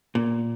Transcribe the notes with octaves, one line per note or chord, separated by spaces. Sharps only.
A#2